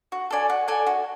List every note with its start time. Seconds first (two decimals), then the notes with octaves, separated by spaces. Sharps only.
0.12 F#4
0.31 A4 D5 G#5
0.50 F#4
0.68 A4 D5 G#5
0.87 F#4